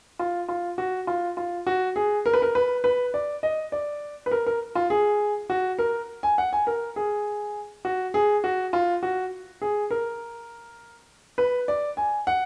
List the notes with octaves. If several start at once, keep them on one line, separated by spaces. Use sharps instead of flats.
F4
F4
F#4
F4
F4
F#4
G#4
A#4
B4
A#4
B4
B4
D5
D#5
D5
B4
A#4
A#4
F4
G#4
F#4
A#4
G#5
F#5
G#5
A#4
G#4
F#4
G#4
F#4
F4
F#4
G#4
A#4
B4
D5
G#5
F#5